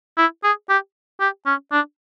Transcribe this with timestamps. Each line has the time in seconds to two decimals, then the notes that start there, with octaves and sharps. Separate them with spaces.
0.18 E4
0.44 G#4
0.69 G4
1.20 G4
1.46 C#4
1.72 D4